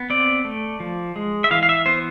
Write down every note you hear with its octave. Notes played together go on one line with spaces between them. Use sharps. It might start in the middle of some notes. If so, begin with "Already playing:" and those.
Already playing: B3
C4 D5
A3
F3
G#3
E5
E3 F5
F5
E5
B3 C5